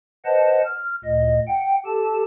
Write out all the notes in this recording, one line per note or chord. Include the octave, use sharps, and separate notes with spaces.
B4 C5 D#5 F#5 A5
F6
D2 A#2 D#5
F#5 G5
G4 A4 A5